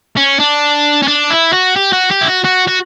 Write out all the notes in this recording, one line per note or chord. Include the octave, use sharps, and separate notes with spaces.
C#4
D4
C#4
D4
E4
F#4
G4
F#4
G4
E4
F#4
F#4
F#4